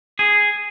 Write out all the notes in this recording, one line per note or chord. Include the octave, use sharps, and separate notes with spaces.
G#4